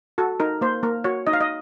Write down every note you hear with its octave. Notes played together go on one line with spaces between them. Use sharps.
F#4 A4
D#4 A#4
A#3 C5
A#3 A#4
F#4 C#5
D#4 D#5
F5
D#5